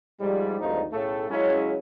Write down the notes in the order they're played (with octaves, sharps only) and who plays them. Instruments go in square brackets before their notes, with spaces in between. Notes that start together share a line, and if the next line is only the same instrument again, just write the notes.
[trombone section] G#2 F3 G3
G#1 D2 G2 F3 D#4
B1 A2 C#3 A3 A4
C#3 F#3 G#3 C#4 E4